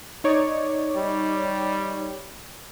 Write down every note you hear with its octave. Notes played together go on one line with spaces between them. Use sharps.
D#4 C#5 D5
G3